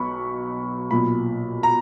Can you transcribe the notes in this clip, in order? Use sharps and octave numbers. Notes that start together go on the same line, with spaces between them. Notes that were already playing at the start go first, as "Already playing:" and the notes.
Already playing: B1 B2 B5 C#6
B1 A#2 B5
A#5